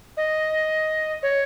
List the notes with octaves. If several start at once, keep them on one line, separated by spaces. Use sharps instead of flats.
D#5
C#5